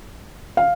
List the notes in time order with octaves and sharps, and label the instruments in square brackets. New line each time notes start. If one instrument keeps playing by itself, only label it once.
[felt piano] F5